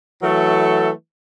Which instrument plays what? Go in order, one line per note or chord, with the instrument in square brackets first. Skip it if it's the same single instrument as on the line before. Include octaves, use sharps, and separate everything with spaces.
[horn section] E3 F#3 A3 A4